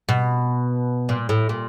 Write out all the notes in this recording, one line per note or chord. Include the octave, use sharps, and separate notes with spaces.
B2
A#2
A2
A#2